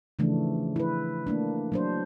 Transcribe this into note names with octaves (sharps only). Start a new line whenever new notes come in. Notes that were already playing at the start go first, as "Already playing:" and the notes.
C#3 E3 F3 A3 D4
E4 B4
A3 A#3 D4
F#3 D4 C5